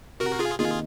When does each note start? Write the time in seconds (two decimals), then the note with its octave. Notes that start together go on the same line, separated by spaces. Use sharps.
0.20 C3 F#4 A#4
0.39 F4 G#4
0.59 D#3 A#3 D#4 F4 G#4